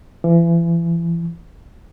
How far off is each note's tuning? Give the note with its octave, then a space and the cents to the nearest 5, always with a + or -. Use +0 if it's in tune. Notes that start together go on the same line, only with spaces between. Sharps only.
E3 +35